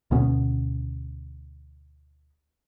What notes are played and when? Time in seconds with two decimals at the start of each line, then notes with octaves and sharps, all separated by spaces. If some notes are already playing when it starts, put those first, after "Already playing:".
0.11 D2 B2 B3 C#4